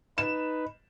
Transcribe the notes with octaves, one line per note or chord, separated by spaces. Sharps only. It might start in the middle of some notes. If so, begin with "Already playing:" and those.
D#4 B4 E7